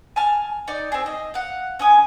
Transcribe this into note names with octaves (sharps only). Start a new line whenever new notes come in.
G#5 A5 F6
D#4 D5
C4 G#4
D#5
F5 F#5
C#4 G#5 D#6